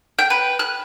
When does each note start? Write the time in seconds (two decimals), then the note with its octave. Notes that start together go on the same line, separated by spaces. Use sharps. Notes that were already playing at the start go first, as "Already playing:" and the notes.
0.19 G5
0.30 B4
0.59 F#6